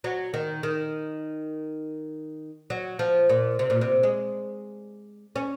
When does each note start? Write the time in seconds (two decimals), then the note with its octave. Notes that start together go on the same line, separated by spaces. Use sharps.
0.04 F#3
0.34 D#3
0.63 D#3
2.70 F#3
2.99 F3
3.29 A#2
3.59 C3
3.70 A#2
3.81 C3
4.03 G#3
5.36 C#4